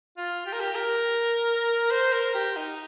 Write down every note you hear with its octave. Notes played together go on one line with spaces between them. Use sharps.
F4
G4
A#4
G4
A#4
C5
A#4
G4
D#4